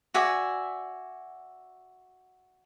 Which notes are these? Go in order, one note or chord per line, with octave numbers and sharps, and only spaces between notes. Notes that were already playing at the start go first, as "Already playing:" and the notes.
F#4 D5 E5 G#5